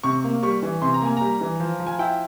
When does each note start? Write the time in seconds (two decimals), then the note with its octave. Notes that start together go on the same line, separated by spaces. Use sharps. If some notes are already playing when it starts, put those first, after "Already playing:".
0.03 C3 C#6
0.24 A#3
0.43 G3 C#6
0.62 E3
0.82 C3 C6
0.94 A#5
1.02 A#3 G#5
1.17 G3 A#5
1.41 E3
1.60 F3
1.80 F3
1.87 G#5
1.99 E4 G5